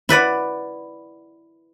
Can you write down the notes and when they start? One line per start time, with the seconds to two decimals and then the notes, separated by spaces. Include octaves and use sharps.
0.09 E4 B4 D5 F#5